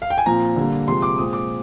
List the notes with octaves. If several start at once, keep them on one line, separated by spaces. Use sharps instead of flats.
F5
G5
G#5
A#2 F3 C4 A#5
D3 G3 A#3
C3 F3 G#3 C6
D6
A#2 G#3 C4 D#6
D6